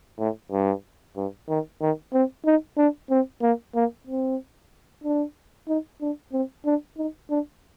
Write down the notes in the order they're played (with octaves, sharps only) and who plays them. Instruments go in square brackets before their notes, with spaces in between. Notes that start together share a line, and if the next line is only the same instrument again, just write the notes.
[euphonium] A2
G2
G2
D#3
D#3
C4
D#4
D4
C4
A#3
A#3
C4
D4
D#4
D4
C4
D4
D#4
D4